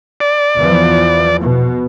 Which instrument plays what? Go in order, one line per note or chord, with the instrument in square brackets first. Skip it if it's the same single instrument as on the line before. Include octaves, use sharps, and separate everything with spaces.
[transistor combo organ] D5
[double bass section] E2 E3 F3
B2